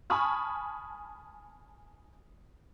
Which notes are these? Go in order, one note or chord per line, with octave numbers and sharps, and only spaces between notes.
G#5 A5 B5 C#6 D#6 F6